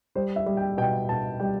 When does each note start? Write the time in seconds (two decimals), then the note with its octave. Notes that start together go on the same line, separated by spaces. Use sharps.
0.15 G3 C5
0.36 E5
0.46 G3
0.57 G5
0.77 B2 G5
1.09 B2 A5
1.40 G3 G5